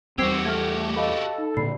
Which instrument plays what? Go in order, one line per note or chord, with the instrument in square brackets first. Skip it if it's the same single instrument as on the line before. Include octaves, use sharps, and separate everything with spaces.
[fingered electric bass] E2 G3 [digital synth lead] C4 [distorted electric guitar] F#4 G4 [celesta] E6 G#6 C7
[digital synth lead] A3 [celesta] F6 G#6
[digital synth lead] A4 [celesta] D#5 F5 B5
[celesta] D#4
[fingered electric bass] A#2 D3 [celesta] D5 B5 C7